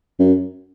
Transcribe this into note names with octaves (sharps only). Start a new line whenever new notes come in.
F#2